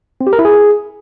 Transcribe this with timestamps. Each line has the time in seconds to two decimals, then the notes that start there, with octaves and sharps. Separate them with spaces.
0.21 C4
0.27 G4
0.33 A#4
0.39 E4
0.45 G#4